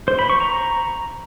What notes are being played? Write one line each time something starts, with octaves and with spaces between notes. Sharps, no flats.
C5
B5
C#6
A#5